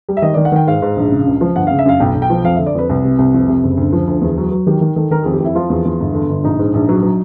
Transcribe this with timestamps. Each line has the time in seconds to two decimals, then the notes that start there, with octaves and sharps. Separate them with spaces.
0.09 G3
0.17 E5
0.22 D#3 D#5
0.34 D#3 D5
0.45 F#5
0.52 D#3 G5
0.67 G#2 F5
0.82 G#2
0.96 A#1
1.12 C#3
1.27 C#2
1.41 F3
1.56 G1 F#5
1.67 C#3 F5
1.79 E5
1.85 F#2 F5
2.00 B1 G5
2.15 B1
2.22 G5
2.30 F3
2.44 F2 F5
2.55 D3 E5
2.66 D5
2.75 F2 B4
2.89 C2 B4
3.04 C3
3.18 C2
3.34 F2
3.48 C3
3.63 F#1
3.77 D2
3.93 F3
4.07 D2
4.21 E2
4.37 F#3
4.51 F#3
4.67 D#3 G4
4.81 D#3
4.96 D#3 A4
5.11 D#3 A#4
5.22 F2 G#4
5.33 G4
5.40 F2 E4
5.55 F3 F4
5.70 E2
5.85 E2
6.00 G1
6.14 D3
6.30 G1
6.43 A#1 D#4
6.59 G#2
6.74 A#1
6.89 F#3
7.03 F#3